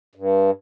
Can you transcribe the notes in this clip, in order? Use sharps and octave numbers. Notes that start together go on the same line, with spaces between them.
G2